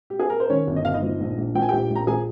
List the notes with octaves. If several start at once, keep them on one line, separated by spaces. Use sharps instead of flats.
G4
G#4
A#4
C5
D#3 C#4 C#5
G1
D#5
G1 F5
D#4 D#5
F3
A#1
A#1
F3 G5
G#5
A#1 G4 G5
A#1
A#5
F3 G#4 G#5